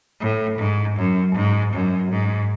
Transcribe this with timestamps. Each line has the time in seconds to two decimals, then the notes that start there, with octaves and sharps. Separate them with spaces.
0.20 A2
0.58 G#2
0.97 F#2
1.35 G#2
1.73 F#2
2.11 G#2